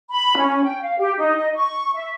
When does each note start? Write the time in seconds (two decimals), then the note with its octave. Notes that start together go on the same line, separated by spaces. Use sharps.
0.10 B5
0.36 C#4
0.63 G5
0.82 F5
0.99 G4
1.18 D#4
1.36 D#5
1.55 C#6
1.94 E5